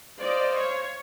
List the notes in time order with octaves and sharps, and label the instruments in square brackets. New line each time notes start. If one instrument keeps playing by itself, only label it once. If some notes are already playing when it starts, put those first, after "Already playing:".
[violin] C5 F5 [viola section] D5 D#5
[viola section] C#5